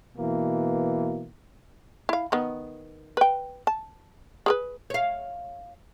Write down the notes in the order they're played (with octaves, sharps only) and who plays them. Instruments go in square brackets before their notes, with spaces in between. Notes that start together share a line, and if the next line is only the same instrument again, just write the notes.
[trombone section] B2 E3 A#3
[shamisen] E4 F5
D#3 B3
B4 G5
A5
G#4 A#4 B4
[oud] C#5 F5